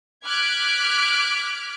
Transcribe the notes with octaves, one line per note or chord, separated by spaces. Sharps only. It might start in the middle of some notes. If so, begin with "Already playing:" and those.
D6 F6 F#6 G#6 B6 D7